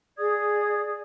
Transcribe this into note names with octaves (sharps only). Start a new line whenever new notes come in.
G#4 D5 D#6 G#6